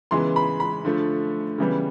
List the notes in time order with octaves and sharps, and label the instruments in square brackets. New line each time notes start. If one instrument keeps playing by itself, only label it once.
[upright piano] C#3 E3 G#3 B3 C6
B5
B5
D3 F3 A3
C#3 E3 G3 B3